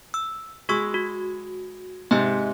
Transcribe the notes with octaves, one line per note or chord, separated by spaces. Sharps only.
E6
G#3 F#4 C#6 E6
F#4
G#2 C3 D#5 E5 G#5